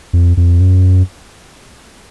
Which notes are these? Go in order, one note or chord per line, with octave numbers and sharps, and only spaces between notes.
F2
F2
F#2